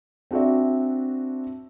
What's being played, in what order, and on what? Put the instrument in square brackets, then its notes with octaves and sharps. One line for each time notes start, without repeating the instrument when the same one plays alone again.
[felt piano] C4 D4 F#4 D5 E5